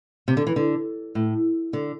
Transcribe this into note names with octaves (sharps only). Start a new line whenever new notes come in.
C3
D3
E3
D3
A2
D3